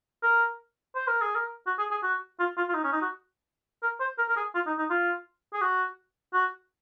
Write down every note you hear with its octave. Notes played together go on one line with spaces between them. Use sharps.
A#4
C5
A#4
G#4
A#4
F#4
G#4
G#4
F#4
F4
F4
F4
D#4
C#4
D#4
F#4
A#4
C5
A#4
A#4
G#4
F4
D#4
D#4
F4
G#4
F#4
F#4